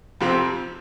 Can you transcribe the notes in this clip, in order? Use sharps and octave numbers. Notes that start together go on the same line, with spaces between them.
F2 C3 F3 C4